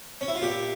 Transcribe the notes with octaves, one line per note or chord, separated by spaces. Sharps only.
C#4
E4
F4
A#2 G4